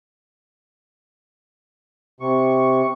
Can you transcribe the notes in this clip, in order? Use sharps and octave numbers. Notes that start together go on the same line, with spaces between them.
C3 C#6